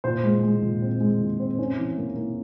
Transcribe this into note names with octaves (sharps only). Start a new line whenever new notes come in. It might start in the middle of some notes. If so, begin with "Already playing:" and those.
A#2 C5
G#3
G#3
A#2
C4
G#3
A#2
C4
C#4
E3
A#3
A#3